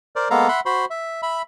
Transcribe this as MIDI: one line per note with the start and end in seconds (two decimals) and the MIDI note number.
0.16 0.28 70
0.16 0.28 72
0.16 0.28 74
0.30 0.48 56
0.30 0.48 58
0.30 0.48 59
0.30 0.48 69
0.30 0.48 77
0.30 0.48 82
0.49 0.60 76
0.49 0.60 78
0.49 0.60 83
0.49 0.60 84
0.66 0.85 66
0.66 0.85 72
0.66 0.85 83
0.66 0.85 84
0.90 1.21 76
1.23 1.42 76
1.23 1.42 83